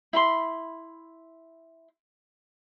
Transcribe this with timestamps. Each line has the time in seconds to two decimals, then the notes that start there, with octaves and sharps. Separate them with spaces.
0.13 E4 B5 C6